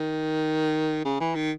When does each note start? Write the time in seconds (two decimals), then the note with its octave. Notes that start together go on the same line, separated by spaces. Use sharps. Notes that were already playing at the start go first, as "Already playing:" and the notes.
Already playing: D#3
1.05 C#3
1.21 E3
1.35 D#3